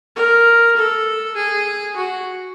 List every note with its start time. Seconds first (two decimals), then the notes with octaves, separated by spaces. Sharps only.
0.16 A#4
0.77 A4
1.36 G#4
1.97 F#4